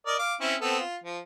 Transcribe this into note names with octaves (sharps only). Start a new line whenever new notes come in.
A#4 D5 D#5
F5 D6
C4 C#4 E4
B3 C4 A4
F4
F3